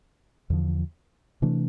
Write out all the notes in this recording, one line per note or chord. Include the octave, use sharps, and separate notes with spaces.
E2 D3 F3
C3 E3 A3 D4